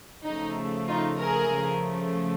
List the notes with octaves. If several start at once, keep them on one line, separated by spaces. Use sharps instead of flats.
C#3 F3 A3 D#4
D#4 F4
G#4 A#4
C#3 F3 A3